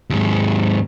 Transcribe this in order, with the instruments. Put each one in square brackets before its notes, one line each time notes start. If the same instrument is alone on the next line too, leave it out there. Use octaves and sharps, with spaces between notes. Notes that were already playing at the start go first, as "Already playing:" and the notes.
[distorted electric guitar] D#2 G#2